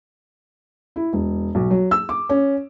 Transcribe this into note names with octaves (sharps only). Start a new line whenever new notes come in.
E4
E1
B1
F#3
E6
D6
C#4